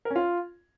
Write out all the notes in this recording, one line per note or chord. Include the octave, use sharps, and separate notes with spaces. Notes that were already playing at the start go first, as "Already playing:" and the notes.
A#4
C#4
F4